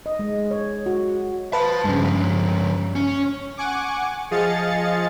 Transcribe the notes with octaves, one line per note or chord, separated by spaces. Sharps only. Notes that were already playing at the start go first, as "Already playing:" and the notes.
D#5
G#3
C#5
F#4
B4 C5 A5
G2 C#3 F3 G#3
C#4
F#5 G#5 C#6 D6
F3 G#4 D#5 F5 A6 C#7